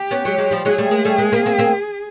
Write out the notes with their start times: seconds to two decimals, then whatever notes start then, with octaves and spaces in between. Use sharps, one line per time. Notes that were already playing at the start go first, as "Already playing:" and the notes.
Already playing: G4
0.11 B3 C#4
0.25 F#3 G#3
0.38 F#3 G#3
0.51 F3 G3
0.65 F#3 G#3 G#4
0.78 G3 A3
0.91 G#3 A#3
1.05 G3 A3
1.18 G#3 A#3
1.32 A#3 C4
1.46 A#3 C4
1.58 A#3 C4